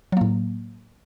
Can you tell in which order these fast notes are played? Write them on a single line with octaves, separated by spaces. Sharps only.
F#3 A#3 A2